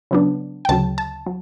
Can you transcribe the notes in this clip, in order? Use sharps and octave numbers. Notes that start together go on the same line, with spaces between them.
C#3 F#3 B3 D4
G5
D2 C#3 F#3 A5
A5
F#3